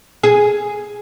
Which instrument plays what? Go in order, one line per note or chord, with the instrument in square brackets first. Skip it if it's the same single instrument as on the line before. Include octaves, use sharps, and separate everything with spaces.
[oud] G#4